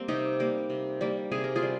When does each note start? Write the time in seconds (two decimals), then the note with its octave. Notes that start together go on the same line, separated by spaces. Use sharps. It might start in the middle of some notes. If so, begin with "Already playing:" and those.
Already playing: G3 A#3 C4
0.08 C3 D#4 G4
0.40 G3 A#3
0.70 C3
1.01 G3 A#3
1.32 C3 G#4
1.44 A#4
1.56 F4 G#4
1.62 G3